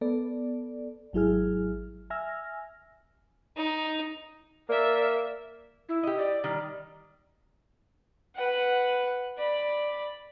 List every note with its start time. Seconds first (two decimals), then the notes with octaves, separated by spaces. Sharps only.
0.01 B3 A4 D5
1.13 G#1 F#3 E4 G#4 F6
2.10 E5 G#5 E6 F6 A#6
3.57 D#4
4.69 A#3 A#4 D5 E5
5.89 E4
6.03 G4 D#5
6.18 D5
6.44 D#3 G3
8.35 B4 F#5
9.37 D5 B5